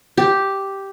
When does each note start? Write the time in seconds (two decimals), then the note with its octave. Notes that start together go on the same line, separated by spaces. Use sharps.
0.17 G4